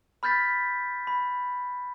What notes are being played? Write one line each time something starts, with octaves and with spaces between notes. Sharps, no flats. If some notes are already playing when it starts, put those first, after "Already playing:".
B5 F6 G6 A6 B6
B5